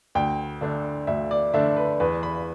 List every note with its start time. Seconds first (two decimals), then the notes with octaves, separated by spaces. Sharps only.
0.15 D2 G5
0.61 D3 A3 D4
1.07 D2 E5
1.31 D5
1.53 D3 A3 D4 E5
1.76 B4
2.00 E2 B4
2.23 B5